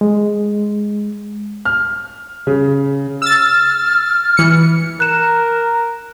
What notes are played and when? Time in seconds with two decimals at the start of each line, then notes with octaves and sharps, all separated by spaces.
0.01 G#3
1.65 F6
2.47 C#3
3.22 E6 F6 A6
4.37 E3 C#7
5.00 A#4 F#6 E7